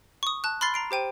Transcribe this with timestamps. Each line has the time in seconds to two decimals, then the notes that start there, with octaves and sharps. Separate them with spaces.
0.23 C#6 D#6
0.44 A5 F#6
0.61 B5 C6 F6 A6 C7 G7
0.74 A#5 C7 D7
0.91 G4 C5 G5 D#7